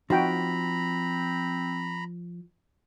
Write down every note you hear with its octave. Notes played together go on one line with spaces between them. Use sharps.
F3 C4 D#4 F#4 G5 A#5 B5